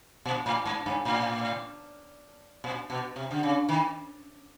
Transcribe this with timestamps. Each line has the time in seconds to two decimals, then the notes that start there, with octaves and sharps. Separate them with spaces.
0.26 A#2
0.46 A2
0.65 G#2
0.86 G2
1.05 A2
2.64 A#2
2.90 B2
3.16 C3
3.31 D3
3.43 C#3
3.69 D#3